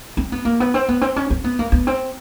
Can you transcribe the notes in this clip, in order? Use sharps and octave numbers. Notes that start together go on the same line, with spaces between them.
C4
B3
A#3
B3
C4
B3
C4
C#4
C4
B3
A#3
B3
C4